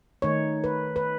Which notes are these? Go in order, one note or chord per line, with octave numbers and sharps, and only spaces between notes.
D#3 A3 D#4 C#5
B4
B4